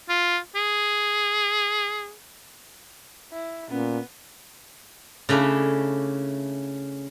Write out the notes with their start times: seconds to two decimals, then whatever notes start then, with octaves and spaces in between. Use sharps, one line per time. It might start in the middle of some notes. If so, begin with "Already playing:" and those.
0.09 F4
0.55 G#4
3.32 E4
3.70 A#2 B3 C#4
5.29 C#3 A3 C#4 D4 E4